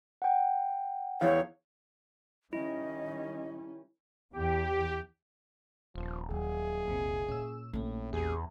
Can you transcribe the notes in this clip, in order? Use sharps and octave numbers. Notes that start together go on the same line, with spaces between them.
F#5 G5
E2 E3 C#5 F5
D#3 G3 C#4 E4 D#5
E2 G4
D#1 F3
D#2 F#3 G#4
A#1 E2 C3
A#2 C#4 E6
A#1 A2 A3 C#4
E2 G4 G#4